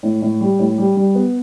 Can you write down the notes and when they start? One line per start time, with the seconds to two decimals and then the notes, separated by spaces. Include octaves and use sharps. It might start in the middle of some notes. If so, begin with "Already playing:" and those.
0.03 A2
0.22 A2
0.41 G3
0.59 A2
0.78 G3
0.96 G3
1.15 B3